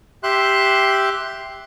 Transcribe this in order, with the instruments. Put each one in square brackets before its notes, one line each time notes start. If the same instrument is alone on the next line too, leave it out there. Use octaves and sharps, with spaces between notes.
[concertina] G4 E5 C6 F#6